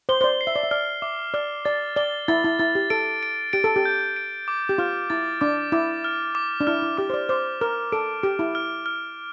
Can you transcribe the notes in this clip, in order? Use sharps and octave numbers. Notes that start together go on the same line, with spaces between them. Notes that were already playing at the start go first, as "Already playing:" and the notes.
C5 G7
C5
D5
C7
E5
D5
E5
D5 F6
E5 D6
D5 F6
D5 A6
D5 G7
E4 A6
E4
E4 A6
G4
A4 D7
D7
G4 D7
A4
G4
G6
D7
D6
G4
F4 F6
E4 A6
D4 D6
E4 D6
F6
D6
D4
E4 F6
E4
G4 D6
C5
D5
C5 D6
A#4 F6
A4 D7
G4 D7
E4
F6
F6